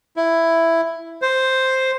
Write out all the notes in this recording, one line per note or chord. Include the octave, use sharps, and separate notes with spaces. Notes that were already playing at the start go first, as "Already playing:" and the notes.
E4
C5